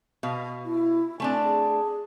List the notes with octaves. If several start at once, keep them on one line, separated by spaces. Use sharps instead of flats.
B2 F5
E4
A3 C4 D4 G#5
G#4